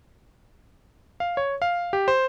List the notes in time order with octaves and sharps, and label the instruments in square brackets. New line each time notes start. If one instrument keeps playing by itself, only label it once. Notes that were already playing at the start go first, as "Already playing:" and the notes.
[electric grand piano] F5
C#5
F5
G4
C5